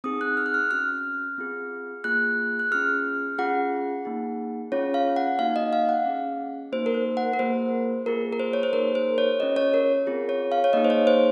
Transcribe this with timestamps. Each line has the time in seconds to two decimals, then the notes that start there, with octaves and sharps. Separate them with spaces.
0.04 C4 D#4 G#4 D#6
0.21 F#6
0.37 F6
0.46 F#6
0.54 F6
0.71 C#4 F#4 F6
1.38 C4 F4 G#4
2.04 A#3 F4 G#4 F#6
2.59 F#6
2.71 C#4 F4 G#4 F6
3.38 C#4 F4 G#4 F#5
4.05 A#3 D#4 G#4
4.72 C#4 F4 G#4 C#5
4.94 F5
5.16 F#5
5.39 A#3 D#4 F#4 F5
5.56 D#5
5.73 F5
5.89 F#5
6.06 C#4 G#4
6.72 A#3 D#4 F#4 C5
6.86 A#4
6.94 C5
7.17 F#5
7.33 A#4
7.39 A#3 F4 G#4 C5
8.06 A#3 F4 G#4 A#4
8.33 A#4
8.40 C5
8.53 C#5
8.63 C5
8.73 A#3 D#4 G#4 A#4
8.95 C5
9.18 C#5
9.40 C#4 F4 G#4 D#5
9.56 C#5
9.74 A#4
10.07 C4 F4 G#4
10.29 C#5
10.52 F5
10.64 C#5
10.73 A#3 D#4 G#4 D#5
10.84 C5
10.90 C#5
11.07 C5